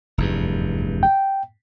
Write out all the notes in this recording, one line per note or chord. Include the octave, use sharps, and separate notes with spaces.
F1 E2 G2
G5